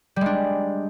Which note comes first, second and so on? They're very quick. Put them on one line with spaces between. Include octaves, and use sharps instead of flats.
G3 G#3 D4